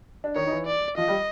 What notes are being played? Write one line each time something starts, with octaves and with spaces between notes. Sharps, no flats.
D4
D#3 D#4 C#5
D#4
E3 E4
D5
F3 F4 D#5
G3 G4